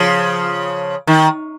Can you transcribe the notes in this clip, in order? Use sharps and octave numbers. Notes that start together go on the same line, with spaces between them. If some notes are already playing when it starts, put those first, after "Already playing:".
Already playing: C#3 F3
D#3